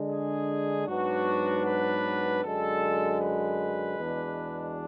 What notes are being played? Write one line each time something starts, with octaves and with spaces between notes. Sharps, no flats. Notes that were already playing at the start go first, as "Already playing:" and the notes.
Already playing: D3 G#3 D4
G#4
G#2 F#3 B3 D4 F#4
B4
F#2 D3 G#3 A4
B4
E2 B2 G#3 D4